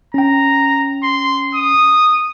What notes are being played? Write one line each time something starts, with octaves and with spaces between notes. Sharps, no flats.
C#4 G5 A#5
C6
D#6